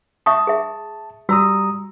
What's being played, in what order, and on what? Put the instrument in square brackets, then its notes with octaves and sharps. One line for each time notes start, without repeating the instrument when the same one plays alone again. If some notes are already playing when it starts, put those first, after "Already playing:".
[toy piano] E5 C#6 D#6 [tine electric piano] A5
[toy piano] G#4 E5
[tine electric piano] G3 A#5 D#6 [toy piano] F#4 E6